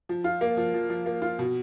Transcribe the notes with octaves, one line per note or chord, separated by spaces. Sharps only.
F3
F4
A#3
F3
F3
F3
A#3
F4
B2